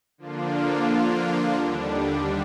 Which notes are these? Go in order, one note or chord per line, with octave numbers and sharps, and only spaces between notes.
D3 F3 A#3 D4 F4
D#2 D3 G3 D4